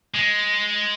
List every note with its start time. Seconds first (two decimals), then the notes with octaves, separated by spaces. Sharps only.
0.14 G#3